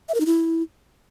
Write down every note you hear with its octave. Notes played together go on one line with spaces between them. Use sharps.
E5
A#4
D#4
E4